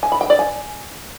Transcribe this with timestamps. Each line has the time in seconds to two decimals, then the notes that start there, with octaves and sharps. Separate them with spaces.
0.03 G#5
0.12 B5
0.21 G5
0.30 D5
0.39 G#5